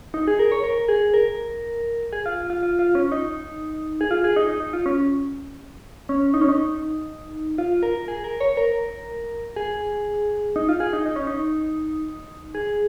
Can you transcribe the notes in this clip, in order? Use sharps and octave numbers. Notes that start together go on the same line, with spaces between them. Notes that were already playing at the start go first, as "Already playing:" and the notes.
D#4
G#4
A#4
C#5
A#4
G#4
A#4
G#4
F4
F4
F4
F4
C#4
D#4
G#4
F4
G#4
D#4
D#4
D#4
F4
C#4
C#4
D#4
C#4
D#4
F4
A#4
G#4
A#4
C#5
A#4
G#4
D#4
F4
G#4
D#4
D#4
C#4
D#4
G#4